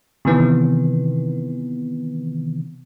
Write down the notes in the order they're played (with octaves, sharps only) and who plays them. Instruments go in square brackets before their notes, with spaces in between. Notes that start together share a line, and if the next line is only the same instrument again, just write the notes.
[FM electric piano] C3 D#3 E3 B3